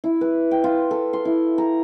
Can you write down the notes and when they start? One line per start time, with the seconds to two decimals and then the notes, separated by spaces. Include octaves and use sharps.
0.04 E4
0.21 B4
0.51 G5
0.64 F4
0.91 A4
1.13 C6
1.25 E4
1.58 A#5